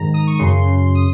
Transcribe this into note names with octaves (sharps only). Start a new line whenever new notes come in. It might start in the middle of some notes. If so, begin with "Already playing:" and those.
Already playing: G#2 D#3 A#5
D#6
C#6
F#2 C#3 C6
D#6